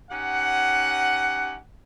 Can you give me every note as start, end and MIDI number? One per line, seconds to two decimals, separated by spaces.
0.11 1.55 61
0.11 1.55 63
0.11 1.55 67
0.11 1.55 78